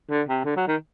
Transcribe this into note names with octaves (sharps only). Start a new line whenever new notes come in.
D3
C3
D3
F#3
D#3